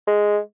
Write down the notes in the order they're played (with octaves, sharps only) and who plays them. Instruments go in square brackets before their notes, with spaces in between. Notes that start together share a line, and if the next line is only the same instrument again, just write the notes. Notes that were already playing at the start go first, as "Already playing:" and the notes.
[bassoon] G#3